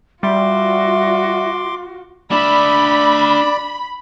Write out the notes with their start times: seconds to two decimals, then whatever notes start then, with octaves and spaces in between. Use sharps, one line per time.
0.23 G3 F4 F#4 E5 C6 D6
2.31 D4 D5 E5 B5